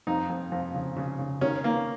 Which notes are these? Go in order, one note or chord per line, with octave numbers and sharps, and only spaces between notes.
F2 D#4
F2
F2
C#3
C#3
C#3
D#3 C#4
D#3 A#3